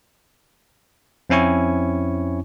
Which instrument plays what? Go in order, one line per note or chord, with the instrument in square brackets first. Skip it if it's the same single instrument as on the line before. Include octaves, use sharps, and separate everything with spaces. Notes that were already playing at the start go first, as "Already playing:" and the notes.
[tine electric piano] F2 C4 C#4 E4 G#5 C#6